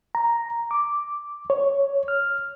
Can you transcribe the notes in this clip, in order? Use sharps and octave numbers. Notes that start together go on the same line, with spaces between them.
A#5
D6
C#5
F6